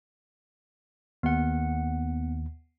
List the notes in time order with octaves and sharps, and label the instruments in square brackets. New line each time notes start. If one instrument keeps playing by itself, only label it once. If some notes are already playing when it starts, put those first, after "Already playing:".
[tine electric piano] D#2 [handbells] B3 F#5